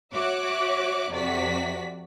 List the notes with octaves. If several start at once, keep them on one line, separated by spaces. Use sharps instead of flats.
F#4 C#5 E5 D6 F#6
F2 C3 F#4 D5 B6